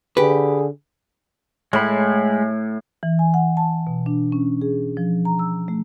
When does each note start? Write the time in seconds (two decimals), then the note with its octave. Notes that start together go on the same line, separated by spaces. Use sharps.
0.17 D3 G4 G#4 B4
1.73 A2 G#3 B5
3.03 E3
3.19 G#5
3.34 F#5
3.57 A5
3.87 B2
4.06 D4
4.32 C#4
4.62 G#4
4.97 F3
5.25 A#5
5.39 E6
5.68 A3